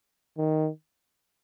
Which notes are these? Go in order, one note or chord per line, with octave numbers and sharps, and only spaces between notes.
D#3